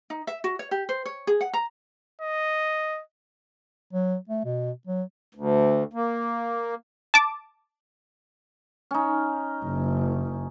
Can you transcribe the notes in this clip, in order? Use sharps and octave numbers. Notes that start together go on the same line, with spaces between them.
D#4
E5
F#4
C#5
G4
C5
C#5
G#4
F#5
A#5
D#5
F#3
A3
B2
F#3
D2
A#3
A5 D6
C#4 D#4
F#1